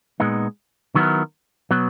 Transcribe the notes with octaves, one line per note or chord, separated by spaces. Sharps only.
A#2 G#3 B3 D#4
D#3 F#3 B3 E4 A#4
B2 F#3 B3